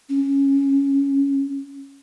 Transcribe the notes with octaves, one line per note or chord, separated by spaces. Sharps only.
C#4